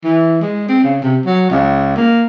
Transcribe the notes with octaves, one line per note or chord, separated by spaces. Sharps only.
E3
G#3
C4
C#3
C3
F#3
C#2
A#3